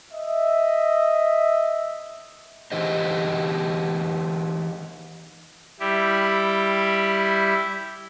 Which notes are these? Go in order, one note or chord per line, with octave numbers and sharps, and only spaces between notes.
D#5 E5
E3 D#4 G4 C5 D#5
G3 E4 G4